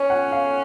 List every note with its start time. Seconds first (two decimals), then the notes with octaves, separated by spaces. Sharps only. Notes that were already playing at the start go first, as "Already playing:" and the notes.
Already playing: C#4 C#5
0.10 F#5
0.32 F5